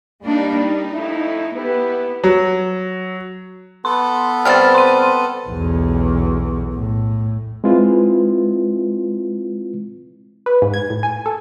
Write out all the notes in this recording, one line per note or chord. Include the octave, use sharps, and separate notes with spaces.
G3 A#3 D4 D#4
D#4
F2 A3 E4
B3 E4 G4 B4
F#3
B3 A4 B4 C6
C3 G3 C4 F6 A6
C6 D#7
B1 E2
A2
G#3 C4 E4 F4 B4
B4
G#2
G#6
A2
G#5
A4